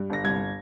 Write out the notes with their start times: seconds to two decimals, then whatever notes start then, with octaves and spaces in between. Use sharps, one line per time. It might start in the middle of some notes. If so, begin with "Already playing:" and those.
Already playing: G2
0.10 G1 A#6
0.24 C2 G#6